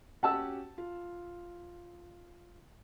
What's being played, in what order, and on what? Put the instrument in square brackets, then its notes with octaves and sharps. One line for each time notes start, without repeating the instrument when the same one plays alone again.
[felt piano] C#4 F#4 G4 [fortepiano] F#5 A5 E6
[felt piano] F4